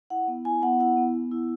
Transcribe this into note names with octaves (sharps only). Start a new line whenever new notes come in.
E4 F#5
B3
E4 G#5
B3 F#5
E4 F#5
B3
B3
E4